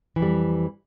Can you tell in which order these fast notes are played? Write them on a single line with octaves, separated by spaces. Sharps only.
E3 F2 G3